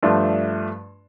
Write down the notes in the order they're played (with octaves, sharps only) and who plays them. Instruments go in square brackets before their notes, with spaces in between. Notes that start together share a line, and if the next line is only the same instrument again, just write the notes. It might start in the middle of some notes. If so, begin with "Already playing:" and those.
[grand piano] G2 F3 A3 D4